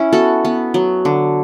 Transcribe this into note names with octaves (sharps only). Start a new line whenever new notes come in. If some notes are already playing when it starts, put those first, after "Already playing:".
Already playing: C#4 E4
B3 F#4 A4
B3
F#3
D3